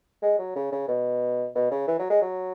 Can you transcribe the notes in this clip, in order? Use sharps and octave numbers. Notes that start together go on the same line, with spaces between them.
G#3
F#3
C#3
C#3
B2
B2
C#3
E3
F#3
G#3
F#3